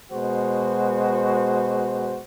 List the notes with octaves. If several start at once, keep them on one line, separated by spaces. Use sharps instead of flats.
B2 G#3 F#4 C5